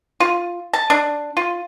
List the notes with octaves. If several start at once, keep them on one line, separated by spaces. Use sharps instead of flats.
F4
A5
D4
F4